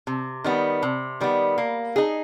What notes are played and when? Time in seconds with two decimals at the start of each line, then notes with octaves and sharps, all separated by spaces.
0.07 C3
0.44 D#3 G3 B3
0.83 C3
1.21 D#3 G3 B3
1.58 A#3
1.96 D#4 G#4